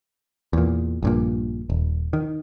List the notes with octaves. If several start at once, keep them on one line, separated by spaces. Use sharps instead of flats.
E2 A#2
A#1 G2 A#2
D#1
D#3